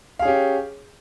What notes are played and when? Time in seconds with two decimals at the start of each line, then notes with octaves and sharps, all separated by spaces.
0.19 F5
0.22 G#4
0.25 C#4
0.28 G4